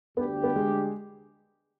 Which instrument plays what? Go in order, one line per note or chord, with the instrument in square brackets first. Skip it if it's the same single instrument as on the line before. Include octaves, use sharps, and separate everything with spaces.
[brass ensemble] D2 D3 G3 D4 G4 [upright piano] B3
[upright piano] B3
G#3